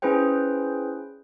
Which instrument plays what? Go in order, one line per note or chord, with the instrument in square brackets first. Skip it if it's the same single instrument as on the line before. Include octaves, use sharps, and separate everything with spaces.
[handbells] C#4 E4 G#4 B4 C5 G5